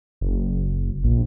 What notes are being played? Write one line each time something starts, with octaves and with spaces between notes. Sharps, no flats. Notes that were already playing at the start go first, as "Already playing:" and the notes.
F#1
A#1